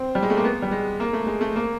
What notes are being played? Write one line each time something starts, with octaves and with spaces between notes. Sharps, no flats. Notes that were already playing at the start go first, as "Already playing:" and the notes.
Already playing: C4
G3
G#3
A3
A#3
B3
G3
G#3
A#3
A3
G#3
A3
A#3